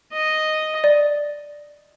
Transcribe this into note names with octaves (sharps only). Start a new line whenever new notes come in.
D#5
D5